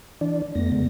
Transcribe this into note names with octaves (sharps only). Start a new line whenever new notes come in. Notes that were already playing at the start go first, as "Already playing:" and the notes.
E3 D4 D5
F2 A3 B3 A#6
C#3 G#3 B3